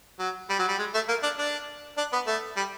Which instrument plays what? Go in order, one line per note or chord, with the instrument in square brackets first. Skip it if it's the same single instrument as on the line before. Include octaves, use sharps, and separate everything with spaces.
[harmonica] F#3
G3
F#3
G3
G#3
A3
A#3
D4
D4
D4
B3
A3
G3